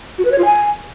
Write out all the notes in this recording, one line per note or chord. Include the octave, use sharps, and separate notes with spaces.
F#4
B4
C#5
F4
G#5